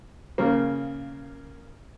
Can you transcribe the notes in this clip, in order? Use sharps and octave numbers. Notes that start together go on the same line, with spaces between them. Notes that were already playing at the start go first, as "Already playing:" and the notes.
C#3 A#3